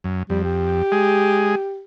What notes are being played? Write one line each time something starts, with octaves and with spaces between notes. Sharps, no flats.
F#2
F2 G3
G4
G#3 G#4